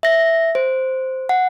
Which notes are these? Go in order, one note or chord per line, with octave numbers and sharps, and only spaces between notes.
E5 A#6
C5
F#5